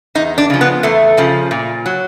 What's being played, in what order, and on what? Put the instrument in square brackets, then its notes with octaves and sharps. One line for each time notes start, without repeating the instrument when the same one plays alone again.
[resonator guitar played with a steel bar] E2 D#4
D4
C#3 F3
B3
E2 A3
C#3 F3
A#2
F#3